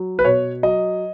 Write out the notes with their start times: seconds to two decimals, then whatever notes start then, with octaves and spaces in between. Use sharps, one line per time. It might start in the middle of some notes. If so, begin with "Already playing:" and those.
Already playing: F#3
0.19 B4
0.25 B2 C#5
0.63 F#3 D#5